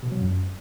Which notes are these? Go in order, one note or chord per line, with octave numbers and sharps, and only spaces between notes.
B2
F#3
F#2